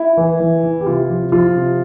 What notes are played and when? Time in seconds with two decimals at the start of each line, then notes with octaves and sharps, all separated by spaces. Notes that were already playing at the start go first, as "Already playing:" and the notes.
Already playing: E4
0.17 E3
0.40 E3
0.63 E3
0.81 G4
0.86 C3 F4
1.09 F3
1.32 F3 F4
1.55 C3